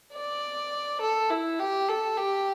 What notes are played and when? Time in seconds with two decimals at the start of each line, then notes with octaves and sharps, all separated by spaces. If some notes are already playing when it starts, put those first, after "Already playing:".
0.13 D5
1.01 A4
1.30 E4
1.59 G4
1.88 A4
2.17 G4